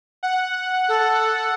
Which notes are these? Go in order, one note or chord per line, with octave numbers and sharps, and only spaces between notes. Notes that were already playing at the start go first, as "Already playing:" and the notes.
F#5
A4